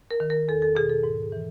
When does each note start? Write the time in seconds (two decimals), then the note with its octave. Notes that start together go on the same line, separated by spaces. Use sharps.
0.11 A#4
0.20 D#3
0.30 A#4
0.48 E2 A4
0.62 A4
0.75 B2 G#4
0.89 A4
1.03 G#2
1.32 E3